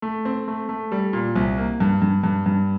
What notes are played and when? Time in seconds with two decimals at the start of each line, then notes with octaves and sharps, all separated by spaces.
0.02 A3
0.25 C4
0.48 A3
0.69 A3
0.92 G3
1.13 A#2
1.36 C2
1.57 A#3
1.80 G2
2.02 G2
2.24 G2
2.46 G2